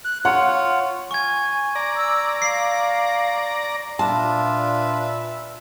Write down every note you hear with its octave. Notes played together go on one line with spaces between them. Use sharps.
F#6
F4 C#5 F#5
G#5 C#6 G#6
D5 A#5
E6
F5 C7
A#2 D4 F4 B4 E5 A5